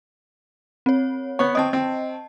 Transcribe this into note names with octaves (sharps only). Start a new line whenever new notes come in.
C4 C#5
B3 C#5 C#6
C4 D#5 A5 D#6
C4